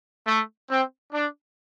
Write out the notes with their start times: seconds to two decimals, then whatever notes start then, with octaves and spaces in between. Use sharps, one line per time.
0.26 A3
0.69 C4
1.13 D4